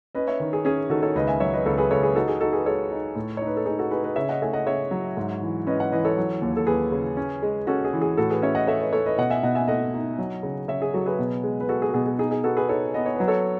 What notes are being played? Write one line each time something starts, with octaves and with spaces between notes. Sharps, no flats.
C#4 B4 D#5
C#5 E5
D#3
G#4
C#4 G#4
D#3 F#4 A4
A4 C#5
C#2 B4 D#5
E5 G#5
F#3 C#5 E5
B4 D#5
C#2 A4 C#5
G#4 B4
C#2 A4 C#5
G#4 B4
D#4 F#4 A4
G#4
D#4 F#4 A4
G#4 B4
G#3 A4 C#5
D#4
A2
D#4 C#5
B4
A4
D#4 G#4
F#4 A4
D#4 G#4 B4
B4 D#5
C#3 C#5 E5
D#5 F#5
A3 E5 G#5
D#5 F#5
C#3 C#5 E5
F#3
G#2
E3
C#4 B4 D#5
D#5 F#5
E3 B4 D#5
A4 C#5
F#3
D#2
A4
D#2 G#4 B4
C#3
C#4
G#3
C#4 F#4 A4
G#4
E3
G#4
A2 F#4 A4
G#4 B4
C#4 C#5 E5
D#5 F#5
A3 C#5 E5
B4 D#5
A3 A4 C#5
B4 D#5
B2 D#5 F#5
E5 G#5
B2 D#5 F#5
E5 G#5
A3 D#5 F#5
D#4
F#3
C#3
C#3 C#5 E5
G#4
F#3 F#4 A4
G#4 B4
B2
G#3
B4
G#3 F#4 A4
G#4
F#4
B2 G#4
G#4
D#4 G#4
G#4
B3 F#4 A4
G#4 B4
D#4 A4 C#5
B3 D#5
C#5
F#3 B4
A4 C#5